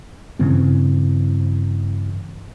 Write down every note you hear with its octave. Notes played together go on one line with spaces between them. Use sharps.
G2 C#3 E3 C4